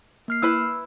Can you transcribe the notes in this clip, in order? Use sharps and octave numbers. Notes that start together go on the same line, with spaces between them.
A#3 F6 C7
E4 B4 B5 E6